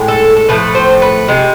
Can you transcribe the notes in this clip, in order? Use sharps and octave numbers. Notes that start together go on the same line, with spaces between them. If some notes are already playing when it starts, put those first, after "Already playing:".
Already playing: A2 G#3
A4
A4
A2 F3 A3 B4
C5
B4
C3 G#3